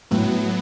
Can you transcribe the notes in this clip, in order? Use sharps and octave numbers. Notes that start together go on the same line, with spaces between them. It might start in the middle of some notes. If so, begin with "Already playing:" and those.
A2 F#3 B3